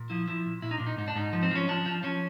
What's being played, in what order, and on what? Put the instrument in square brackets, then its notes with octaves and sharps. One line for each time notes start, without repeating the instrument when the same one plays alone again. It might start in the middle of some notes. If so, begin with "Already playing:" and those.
Already playing: [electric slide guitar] A#2
F3 E4
F3 E4
A#2
A#2 E4
D#4
A#2 D4
D#4
G#2 D#4
D4
G#2 D#4
F3
C4
F3 C#4
F3 D4
F3
F3 C#4